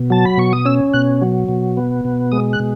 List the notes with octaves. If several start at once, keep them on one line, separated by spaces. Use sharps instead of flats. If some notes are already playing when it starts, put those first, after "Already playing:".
Already playing: B2
F#3 A5
B5
B2 C#6
D#6
C#4 E6
B2 F#6
F#3
B2
B3
B2
G#3 D#6
F#6
B2